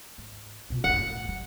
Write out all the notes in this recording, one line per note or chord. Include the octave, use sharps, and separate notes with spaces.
G#2
B2 F4
F1 C2 F#5
A2
D3 G3